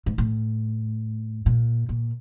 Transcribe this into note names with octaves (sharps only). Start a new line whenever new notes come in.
G#2
A2
A#2
A#2